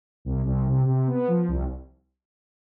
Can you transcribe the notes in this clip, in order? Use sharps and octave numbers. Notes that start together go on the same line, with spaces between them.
C2
C2
C3
C3
B3
F3
C2